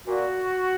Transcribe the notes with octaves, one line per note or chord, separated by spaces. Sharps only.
A#2 F#4